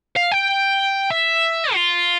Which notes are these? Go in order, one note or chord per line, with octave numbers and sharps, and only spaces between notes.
F5
G5
E5
F4